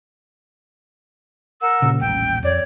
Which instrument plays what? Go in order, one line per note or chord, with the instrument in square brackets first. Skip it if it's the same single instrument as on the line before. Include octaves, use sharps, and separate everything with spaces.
[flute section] A#4 F#5 E6
[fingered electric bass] A#2 C#3
[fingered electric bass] D#1 A1 [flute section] G5
[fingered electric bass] F2 [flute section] C#5 D5